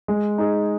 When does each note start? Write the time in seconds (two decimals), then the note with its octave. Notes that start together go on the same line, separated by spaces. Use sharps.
0.08 G#3
0.38 D#4 G#4